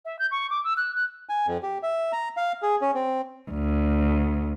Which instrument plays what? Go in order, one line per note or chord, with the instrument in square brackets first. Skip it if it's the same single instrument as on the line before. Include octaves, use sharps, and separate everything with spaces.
[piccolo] E5
G6
C#6
D6
E6
F#6
F#6
[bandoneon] G#5
F2
G4
E5
A#5
F5
G#4
C#4
C4
[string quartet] D2